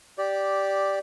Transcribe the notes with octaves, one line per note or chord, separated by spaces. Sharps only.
G4 D5